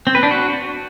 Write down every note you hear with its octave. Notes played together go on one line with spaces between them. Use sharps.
C4
B4
D4
F#4